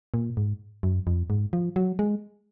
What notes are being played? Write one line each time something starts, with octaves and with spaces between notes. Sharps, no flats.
A#2
G#2
F#2
F2
G#2
F3
F#3
G#3